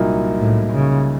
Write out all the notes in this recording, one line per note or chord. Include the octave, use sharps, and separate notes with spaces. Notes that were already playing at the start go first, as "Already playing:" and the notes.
Already playing: C2 A#2 F#3 A#3 D#4
A2
C#3